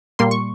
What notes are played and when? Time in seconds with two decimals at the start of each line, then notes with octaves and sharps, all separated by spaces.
0.19 A#2 G3 A#3 C6
0.31 C#6